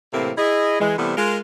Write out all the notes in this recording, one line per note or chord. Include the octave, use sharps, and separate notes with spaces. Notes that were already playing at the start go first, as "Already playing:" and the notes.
A2 C3 E3 A3 A#3 C4
E4 G#4 D#5
E3 G#3
C3 E3 G3 A3 B3
G#3 F4 A#4